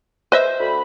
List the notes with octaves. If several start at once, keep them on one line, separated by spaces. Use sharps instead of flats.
B4 C5 D#5 E5
D2 B5